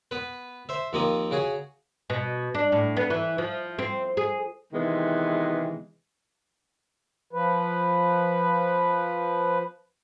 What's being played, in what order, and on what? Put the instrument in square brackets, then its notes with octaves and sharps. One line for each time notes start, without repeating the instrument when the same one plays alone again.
[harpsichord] B3 B4
C5 E5
D#2 F3 A#3 C4 D#5
C#3 F#4 G#4
[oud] B2
D4
A2
B3
E3
F3
C4
G#4
[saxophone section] C3 D#3 E3 G#3 B3
[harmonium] F3 B4